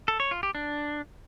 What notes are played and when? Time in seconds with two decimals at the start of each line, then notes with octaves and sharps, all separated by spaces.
0.08 A4
0.20 C#5
0.31 F4
0.43 G4
0.55 D4